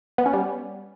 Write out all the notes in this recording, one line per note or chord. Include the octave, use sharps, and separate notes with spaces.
B3
C#4
G3